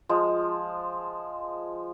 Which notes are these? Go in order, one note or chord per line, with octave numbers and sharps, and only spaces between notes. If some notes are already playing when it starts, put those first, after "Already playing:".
F3 G#3